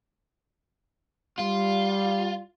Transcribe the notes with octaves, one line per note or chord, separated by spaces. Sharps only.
G3 F4